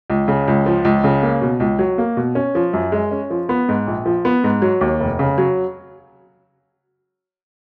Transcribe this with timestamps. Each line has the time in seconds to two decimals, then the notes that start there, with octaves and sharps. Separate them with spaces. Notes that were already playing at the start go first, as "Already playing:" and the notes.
0.10 C#2
0.28 C#3
0.48 C#2
0.66 F3
0.85 C#2
1.04 C#3
1.23 A#3
1.42 B2
1.60 C#2
1.79 F#3
1.98 A#3
2.17 B2
2.35 C#4
2.55 F3
2.73 F#2
2.92 G#3
3.11 C#4
3.30 F3
3.49 B3
3.69 G#2
3.87 A#1
4.06 F3
4.25 B3
4.44 G#2
4.62 F#3
4.81 D#2
5.00 F1
5.19 C#3
5.38 F#3